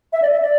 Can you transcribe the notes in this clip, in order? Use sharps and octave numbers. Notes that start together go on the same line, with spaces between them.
E5
D5
E5
D5